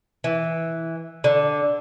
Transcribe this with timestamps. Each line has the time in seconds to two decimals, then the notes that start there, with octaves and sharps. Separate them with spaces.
0.24 E3
1.24 D3